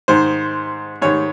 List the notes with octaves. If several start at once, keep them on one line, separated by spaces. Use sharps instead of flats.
G#2 D#3 C5
G#2 D#3 C#5